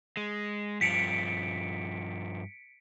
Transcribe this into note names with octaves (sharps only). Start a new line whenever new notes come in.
G#3
G2 F3 B6 C#7 D7